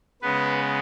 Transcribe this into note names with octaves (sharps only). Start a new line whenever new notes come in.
C#3 G#3 B3 B4